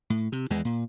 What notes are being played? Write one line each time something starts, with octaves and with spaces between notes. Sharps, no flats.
A2
C3
E2 E3 G#3
A#2